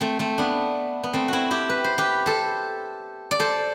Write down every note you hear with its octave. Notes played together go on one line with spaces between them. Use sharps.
A3 C4
A3 C4
B3 D4
B3
A3 C4
C4 E4 F#4
E4 G4
B4
C5
G4 B4
A4 C5
D5
A4 C5